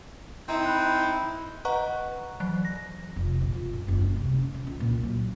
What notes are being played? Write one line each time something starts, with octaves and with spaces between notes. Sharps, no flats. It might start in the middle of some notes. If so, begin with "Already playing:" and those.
C4 D#4 E4 A#5
B5 F#6
B4 D#5 F#5 A#5 C#6 F#6
E3 F#3 F#6
A#6
F1
A#1
F4
F#2
F#1
G2
C3
C#4
D#4
C#2
A#2
F#3